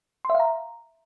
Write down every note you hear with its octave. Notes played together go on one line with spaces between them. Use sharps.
C6
E5
F5
A#5